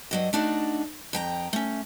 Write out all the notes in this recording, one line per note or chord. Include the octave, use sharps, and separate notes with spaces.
G2 F#3 D#5
A3 D4 D#4 F#4
F2 G5 A#5
A3 C#4